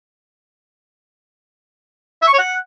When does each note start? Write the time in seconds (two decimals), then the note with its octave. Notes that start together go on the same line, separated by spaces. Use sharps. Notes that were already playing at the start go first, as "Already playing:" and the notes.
2.22 E5
2.27 C#6
2.33 C#5
2.39 F#5